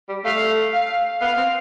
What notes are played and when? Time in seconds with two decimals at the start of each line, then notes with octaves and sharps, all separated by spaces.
0.09 G3
0.25 A3 F5
0.74 F5
1.21 B3 F5
1.37 C4